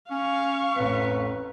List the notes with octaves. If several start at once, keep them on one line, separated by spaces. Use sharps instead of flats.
C#4 F5 C#6
A1 F2 B4